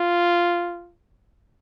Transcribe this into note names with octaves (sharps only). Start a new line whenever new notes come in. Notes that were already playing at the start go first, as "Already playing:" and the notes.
Already playing: F4